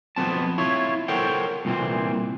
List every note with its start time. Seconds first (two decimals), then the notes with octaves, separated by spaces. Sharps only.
0.16 F2 F3 B3 C4 A5
0.58 E4 F4 C#5
1.08 A4 A#4 C5 C#5 F#5 G5
1.65 C2 A#2 E3 C4